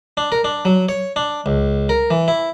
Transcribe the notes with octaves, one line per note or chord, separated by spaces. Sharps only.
D4
A#4
D4
F#3
C#5
D4
C#2
A#4
E3
E4